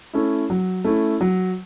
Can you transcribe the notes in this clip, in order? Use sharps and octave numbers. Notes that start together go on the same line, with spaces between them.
A3 C#4 E4
F#3
A3 C#4 E4
F#3